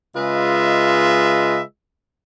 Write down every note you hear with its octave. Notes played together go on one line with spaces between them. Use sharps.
C#3 G#3 F4 B4 D#5 E5